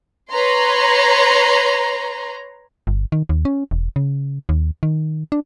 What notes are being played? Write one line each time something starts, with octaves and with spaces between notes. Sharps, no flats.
B4 C#5 A#5 C6
G1
D#3
D#2
C#4
E1
C#3
D#2
D#3
D4